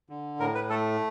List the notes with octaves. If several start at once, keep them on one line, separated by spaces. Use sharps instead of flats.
D3
A2 A#4
B4
A3 A4